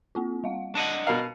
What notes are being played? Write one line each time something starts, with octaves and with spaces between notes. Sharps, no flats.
A#3 C4 F4
G3 F5 F#5
D4 D#5 F#5 A5 C#7 D#7
B2 A#4 F5